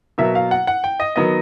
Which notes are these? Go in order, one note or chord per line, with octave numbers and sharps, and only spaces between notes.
B2 F#3 A#3 E5
F5
F#5
F#5
G5
D#5
D#3 F#3 B3 D#5